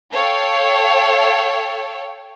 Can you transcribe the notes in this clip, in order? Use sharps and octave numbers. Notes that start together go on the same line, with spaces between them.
A4 C#5 F5 G5